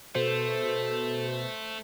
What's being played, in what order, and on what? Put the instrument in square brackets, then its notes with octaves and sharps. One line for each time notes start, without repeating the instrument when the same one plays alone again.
[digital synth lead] B2 [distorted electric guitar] A3 [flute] A4 [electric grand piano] C5